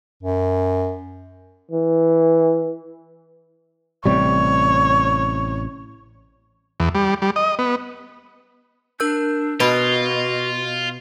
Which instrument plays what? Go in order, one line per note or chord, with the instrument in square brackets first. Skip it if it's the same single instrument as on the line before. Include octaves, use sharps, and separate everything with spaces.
[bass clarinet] F#2
[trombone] E3
[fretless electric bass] A1 C3 G3 [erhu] C#5
[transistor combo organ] E2
G3
G3
D#5
B3
[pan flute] D4 [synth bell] A#4 E6 G6
[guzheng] B2 [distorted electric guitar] F4 [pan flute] F#4 [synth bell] B4 B5 C7